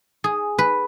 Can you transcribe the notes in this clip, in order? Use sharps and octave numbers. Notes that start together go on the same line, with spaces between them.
G#4
B4